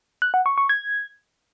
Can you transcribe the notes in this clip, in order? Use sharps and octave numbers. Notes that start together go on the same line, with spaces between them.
F#6
F#5
C#6
C#6
G#6